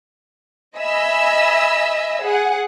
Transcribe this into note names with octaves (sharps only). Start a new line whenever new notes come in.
D#5 E5 G#5 B5 E6
G#4 F#5